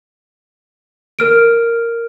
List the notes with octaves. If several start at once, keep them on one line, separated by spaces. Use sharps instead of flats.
A#4 F6 D7